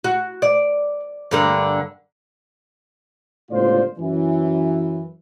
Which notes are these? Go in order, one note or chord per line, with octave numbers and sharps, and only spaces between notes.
F#4
D5
G2 D3 A#3
G1 C#2 A2 F4 C5 D5
F#2 E3